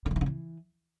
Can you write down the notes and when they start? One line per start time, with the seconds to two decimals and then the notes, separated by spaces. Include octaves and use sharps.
0.06 D3
0.11 D#3
0.16 E3
0.21 D3
0.26 E3